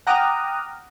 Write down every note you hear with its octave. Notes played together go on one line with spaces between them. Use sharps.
F#5 G5 A#5 D6 D#6 F6